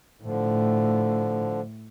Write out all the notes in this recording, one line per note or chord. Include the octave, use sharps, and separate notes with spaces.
A2 D3 F3